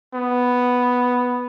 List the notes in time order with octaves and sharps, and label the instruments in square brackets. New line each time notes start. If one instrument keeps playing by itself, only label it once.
[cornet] B3